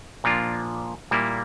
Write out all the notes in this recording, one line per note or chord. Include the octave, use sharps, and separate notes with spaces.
A#2 F3 A#3 D4 F4
A#2 G3 A#3 E4